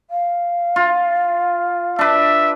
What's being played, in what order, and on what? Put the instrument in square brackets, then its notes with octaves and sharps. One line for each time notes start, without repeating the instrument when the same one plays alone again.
[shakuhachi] F5
[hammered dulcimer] F4
[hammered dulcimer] D4 B4 [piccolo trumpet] E5